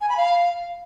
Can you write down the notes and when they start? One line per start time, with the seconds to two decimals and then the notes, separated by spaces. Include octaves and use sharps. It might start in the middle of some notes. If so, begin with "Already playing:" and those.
0.01 G#5
0.09 B5
0.17 F5